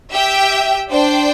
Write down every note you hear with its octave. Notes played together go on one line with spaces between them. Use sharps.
G4 E5 G5
D4 C5 G5